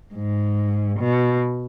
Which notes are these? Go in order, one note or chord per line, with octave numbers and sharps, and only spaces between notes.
G#2
B2